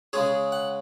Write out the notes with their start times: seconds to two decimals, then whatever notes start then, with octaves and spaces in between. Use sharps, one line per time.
0.13 C#3 G#3 C#4 G#4
0.52 F#5